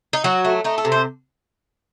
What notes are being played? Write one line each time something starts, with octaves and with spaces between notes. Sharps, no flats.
D#4
F#3 F#4
A3
A3 D#4
A4
C3
C5